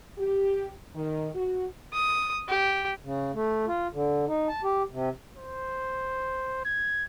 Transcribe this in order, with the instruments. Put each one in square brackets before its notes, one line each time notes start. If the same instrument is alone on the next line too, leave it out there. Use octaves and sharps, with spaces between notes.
[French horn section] G4
D#3
F#4
[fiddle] D#6
G4
[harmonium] C#3
A3
F4
D3
D#4
A5
G4
C3
[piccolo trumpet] C5
G#6